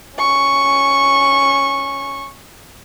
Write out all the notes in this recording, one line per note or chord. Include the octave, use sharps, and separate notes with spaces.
C#4 C#6